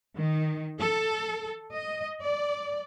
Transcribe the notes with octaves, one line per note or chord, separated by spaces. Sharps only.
D#3
A4
D#5
D5